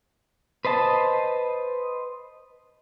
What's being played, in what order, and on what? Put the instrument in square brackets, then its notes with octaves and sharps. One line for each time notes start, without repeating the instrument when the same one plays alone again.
[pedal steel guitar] B4 C5 D#5 A5